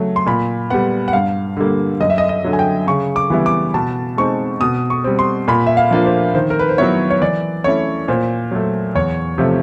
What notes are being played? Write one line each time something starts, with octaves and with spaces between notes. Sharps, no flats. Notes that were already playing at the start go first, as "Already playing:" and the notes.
Already playing: C#3 F#3 A3
C6
A#2 B5
G3 B3 F#5
F#5
G2 F5
D3 G3 A#3
F#2 D#5
E5
D#5
D#5
D3 F#3
G#5
G5
C#3 C#6
D6
E3 G3 B3 E4
D6
B2 A5
G#3 C4 D#4 C#6
B2 D#6
C#6
G3 C4
C6
A#2 B5
E5
F5
F3 A#3 D4 F4
C5
D#3 C5
A#4
B4
C5
F#3 B3 E4 C#5
C#5
E3 D5
A3 C#4 E4 C#5
A#2 C5
F#3 A3
E2 C#5
C3 F3 A3